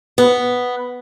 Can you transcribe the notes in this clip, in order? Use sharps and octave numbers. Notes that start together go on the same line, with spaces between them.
B3